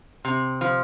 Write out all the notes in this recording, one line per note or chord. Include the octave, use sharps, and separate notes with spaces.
C3
F3